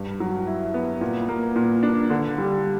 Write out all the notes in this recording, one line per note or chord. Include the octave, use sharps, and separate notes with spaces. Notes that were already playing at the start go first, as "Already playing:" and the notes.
Already playing: G2
F#3
E4
B3
A#2
A#3
A#2
D4
D3
G3